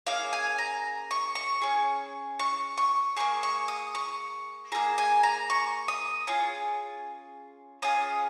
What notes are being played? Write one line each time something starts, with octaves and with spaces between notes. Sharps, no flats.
A#3 C#4 G#4 F5
G#5
A#5
C#6
C#6
C#4 G#4
C#6
C#6
A#3 D#4 G#4 C#6
C#6
D#6
C#6
A#3 F4 G#4 A#5
G#5
A#5
C#6
D#6
C#4 F4 G#4
C#4 F4 G#4 D#6